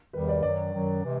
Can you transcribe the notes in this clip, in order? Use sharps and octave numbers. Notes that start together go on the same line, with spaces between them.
E2 C3 D#3 G3 B4
D5
F#2 D#3 F#3 D5
F#2 D#3 F#3
C3 E3 G#3